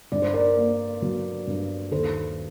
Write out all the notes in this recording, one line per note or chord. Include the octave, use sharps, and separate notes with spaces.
G2 D5
C5
A#4 D5
A#3
F#3
G2
D#2 A4 C5